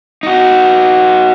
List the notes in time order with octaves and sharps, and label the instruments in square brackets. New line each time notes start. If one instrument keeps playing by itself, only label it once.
[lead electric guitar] D#4 F#4